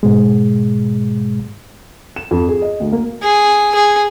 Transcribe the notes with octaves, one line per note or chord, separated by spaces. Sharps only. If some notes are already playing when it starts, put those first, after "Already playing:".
G#2 B2 G#3
E7
F2
G#4
D#5
D2
A#3
G#4
G#4